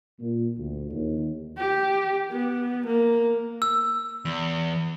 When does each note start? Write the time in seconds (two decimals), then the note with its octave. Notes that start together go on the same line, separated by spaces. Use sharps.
0.20 A#2
0.58 D2
0.92 D#2
1.58 G4
2.31 B3
2.87 A#3
3.62 E6
4.25 E2